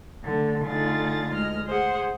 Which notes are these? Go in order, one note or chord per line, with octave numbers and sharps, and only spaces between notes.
D3 A3
D3 A3 D#4 F4 G#4 A6
D2 G#3 D#5 F6
G#4 C5 F#5